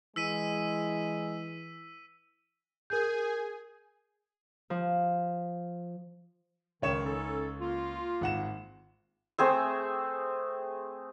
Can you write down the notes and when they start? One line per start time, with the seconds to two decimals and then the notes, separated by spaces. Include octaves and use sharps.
0.16 E3 G#3 E6 B6 D#7
2.90 G#4 A#4 G#5 G6
4.70 F3
6.82 C#2 D#3 C#5 E7
7.05 C#4 D#4 A4
7.60 A#3 F4
8.21 G#1 F#5 E7
9.38 A3 C4 G#4 E5